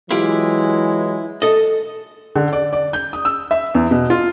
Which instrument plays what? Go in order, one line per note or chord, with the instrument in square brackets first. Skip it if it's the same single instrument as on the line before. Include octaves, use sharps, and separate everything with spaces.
[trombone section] E3 F#3 G#3 [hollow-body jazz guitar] E4 F4 G4
[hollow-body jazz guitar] A4 D#5
[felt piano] D3
D5
D5
G6
D#6
E6
E5
E2
B2
F4